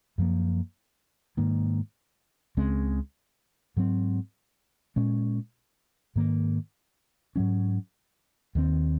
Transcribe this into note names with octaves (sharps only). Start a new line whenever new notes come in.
F#2 F3 A#3
G#2 D#3 A#3
C#2 C#3 G#3 C4
G#2 F#3 C4
A#2 G#3 C#4
G#2 D#3 A#3
G#2 F#3 C#4
D#2 D#3 G#3 C4